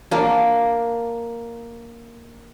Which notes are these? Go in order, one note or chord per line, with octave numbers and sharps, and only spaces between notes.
A#3 D4